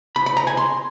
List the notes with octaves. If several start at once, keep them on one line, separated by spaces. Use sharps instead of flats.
B5
B5
A#5
G#5
C6